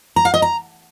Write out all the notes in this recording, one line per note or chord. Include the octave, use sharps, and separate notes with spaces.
A#5
F5
D#5
A#5